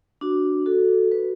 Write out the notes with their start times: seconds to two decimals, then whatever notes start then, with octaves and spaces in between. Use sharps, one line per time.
0.21 D4 F#4
0.66 F#4 A4
1.12 B4